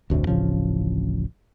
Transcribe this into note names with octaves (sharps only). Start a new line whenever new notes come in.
F1 D2 A2 C3
D1 A1 C#3 F3